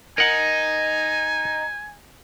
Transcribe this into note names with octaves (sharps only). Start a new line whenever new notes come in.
D#4 A#4 F#5 G#5